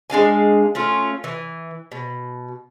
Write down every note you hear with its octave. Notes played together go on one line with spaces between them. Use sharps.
G#3 D4 F5 G#5
A3 C#4 F4
E3
B2